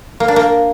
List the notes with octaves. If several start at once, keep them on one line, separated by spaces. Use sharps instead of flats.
A#3
D4
A#3